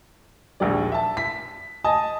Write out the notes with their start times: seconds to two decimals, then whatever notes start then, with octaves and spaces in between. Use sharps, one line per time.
0.60 A#1 D#2 D#3 G#3 D5
0.92 E5 A5
1.17 B6
1.84 D#5 G#5 A5 D#6